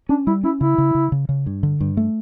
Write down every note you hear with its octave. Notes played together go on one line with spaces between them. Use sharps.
C#4 D4
G3 E4
C#4 E4
C#3 E4
C#3
C#3
C#3
C#3
G2
D3
G2
A3